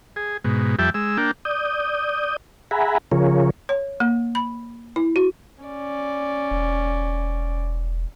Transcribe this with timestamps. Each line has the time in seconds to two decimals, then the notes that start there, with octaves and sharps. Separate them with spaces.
0.16 G#4
0.44 G#2 B2
0.79 F2 G3 E5 G5 A5
0.94 G#3 E6
1.17 A#3 D4 G5
1.45 D5 D#6 G6
2.71 G#4 E5 F#5 G#5 A#5 B5
3.12 C#3 F3 F4 G#4 A#4 C#5
3.69 C#5
4.00 A#3
4.35 B5
4.96 E4
5.16 F#4
5.63 C#4 D5
6.51 E1